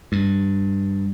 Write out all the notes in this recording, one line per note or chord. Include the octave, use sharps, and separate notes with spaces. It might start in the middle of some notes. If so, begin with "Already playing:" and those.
G2